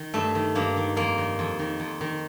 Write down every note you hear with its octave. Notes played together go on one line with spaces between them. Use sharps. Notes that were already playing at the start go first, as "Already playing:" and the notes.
Already playing: D#3
G2 A3
D#3
G2 A#3
D#3
F2 A#3
D#3
F2
D#3
F2
D#3